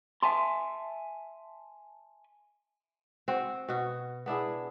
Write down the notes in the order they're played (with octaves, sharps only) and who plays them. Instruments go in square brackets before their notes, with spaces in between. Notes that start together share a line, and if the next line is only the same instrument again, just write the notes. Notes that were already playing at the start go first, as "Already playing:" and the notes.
[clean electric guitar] E5 G#5 A5 C6
[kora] C4 F#4
B2 F#4
B3 D4 E4 G#4